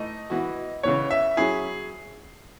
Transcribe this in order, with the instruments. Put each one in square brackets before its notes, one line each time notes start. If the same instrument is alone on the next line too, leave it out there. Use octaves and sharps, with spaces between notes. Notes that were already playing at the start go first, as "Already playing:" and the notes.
Already playing: [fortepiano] E3 A3 D#4 [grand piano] D#5
[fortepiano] E3 B3 F#4
[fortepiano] C#3 E3 B3 [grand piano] C#5
[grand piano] E5
[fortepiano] F#3 C#4 E4 [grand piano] G#4